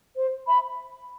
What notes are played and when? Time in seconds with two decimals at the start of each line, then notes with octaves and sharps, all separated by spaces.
0.16 C5
0.47 E5 B5